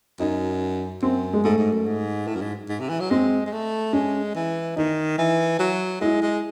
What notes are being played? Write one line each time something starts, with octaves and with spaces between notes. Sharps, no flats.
F#2 D#4
F#2 C4
G#3
G#2 A3
G#2
F#2
G#2
A2
F#2
G#2
G#2
C3
E3
F#3
G#3 C4
G#3
A3
G#3 C#4
E3
D#3 D#4
E3
F#3
G#3 E4
G#3